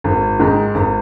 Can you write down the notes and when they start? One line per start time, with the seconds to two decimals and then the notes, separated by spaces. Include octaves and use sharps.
0.04 G#1
0.40 G#2 D#3
0.75 G#1